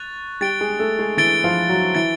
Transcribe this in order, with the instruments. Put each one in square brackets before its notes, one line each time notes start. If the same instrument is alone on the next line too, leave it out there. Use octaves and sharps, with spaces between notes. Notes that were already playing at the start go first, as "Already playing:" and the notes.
Already playing: [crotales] C#6 F#6 A6 F7
[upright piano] G3 G4 [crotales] A6 D7 G7
[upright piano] G#3 G#4
A3 A4
G#3 G#4
[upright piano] E3 E4 [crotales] A6 D7 G7
[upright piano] F3 F4
F#3 F#4
[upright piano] E3 E4 [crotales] A6 D7 G7